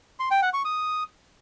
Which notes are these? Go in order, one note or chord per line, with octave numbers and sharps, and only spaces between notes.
C6
G5
F#5
C#6
D#6